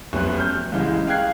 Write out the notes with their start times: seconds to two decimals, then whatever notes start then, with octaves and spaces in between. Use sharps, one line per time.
0.13 F1 F#2 B3 F#6
0.37 F6 G6
0.72 C2 C#3 E3 G#3
1.07 F5 G5 F6 F#6 G#6 C7